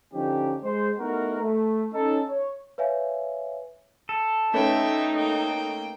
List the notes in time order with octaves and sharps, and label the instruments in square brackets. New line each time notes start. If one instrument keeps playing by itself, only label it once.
[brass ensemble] D3 F3 C#4 D#4 G4
G#3 C5
A3 B3 D#4 E4 F#4 A#4
A3
C#4 D#4 A4
C#5
[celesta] B4 C#5 E5 F5 G#5
[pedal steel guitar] A4
[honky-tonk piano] A3 C#4 B4 [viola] D#4 [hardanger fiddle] E5 G5
[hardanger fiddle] A#3 G5